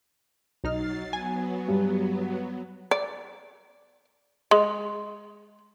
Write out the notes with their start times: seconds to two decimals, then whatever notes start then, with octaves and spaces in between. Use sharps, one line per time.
0.64 B1 F#3 D#4 F6 A6 C7
1.13 F#3 B3 G#5
1.68 G2
2.91 D5
4.51 G#3